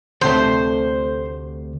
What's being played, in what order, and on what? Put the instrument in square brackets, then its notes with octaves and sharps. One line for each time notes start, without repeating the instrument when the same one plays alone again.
[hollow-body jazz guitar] D2 C3 A3 [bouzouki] C5